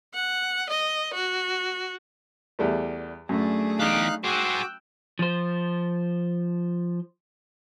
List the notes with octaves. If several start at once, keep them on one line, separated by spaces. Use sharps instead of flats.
F#5
D#5
F#4
E2 G3 A3
F#2 A3 D4 G#4
E2 D#4 G4 F5 F#6
F#4 G#4 C5 G5 D6 E6 F#6
F3 C5